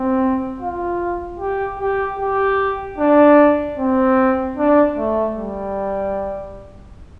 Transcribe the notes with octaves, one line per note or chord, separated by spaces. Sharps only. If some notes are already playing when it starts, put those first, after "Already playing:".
Already playing: C4
F4
G4
G4
G4
D4
C4
D4
A3
G3